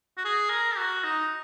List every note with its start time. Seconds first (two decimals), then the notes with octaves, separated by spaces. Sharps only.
0.18 F#4
0.25 G#4
0.50 A#4
0.77 F#4
1.04 D#4